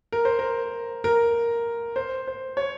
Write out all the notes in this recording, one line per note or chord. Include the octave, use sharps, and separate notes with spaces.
A#4
C5
A#4
A#4
C5
C5
C#5